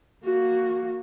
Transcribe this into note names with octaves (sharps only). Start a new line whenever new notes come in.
A#3 F#4